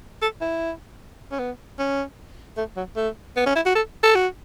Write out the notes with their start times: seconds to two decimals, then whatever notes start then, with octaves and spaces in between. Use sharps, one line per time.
0.22 A4
0.41 E4
1.31 C#4
1.39 B3
1.79 C#4
2.57 A3
2.77 F#3
2.96 A3
3.36 B3
3.46 C#4
3.55 E4
3.66 F#4
3.75 A4
4.03 A4
4.15 F#4